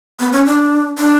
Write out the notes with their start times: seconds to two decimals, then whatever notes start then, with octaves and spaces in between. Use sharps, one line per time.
0.20 B3
0.32 C#4
0.46 D4
0.99 D4